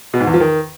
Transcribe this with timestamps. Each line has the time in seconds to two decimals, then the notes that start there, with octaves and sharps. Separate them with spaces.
0.14 B2
0.20 G#2
0.27 E2
0.34 F3
0.41 D#3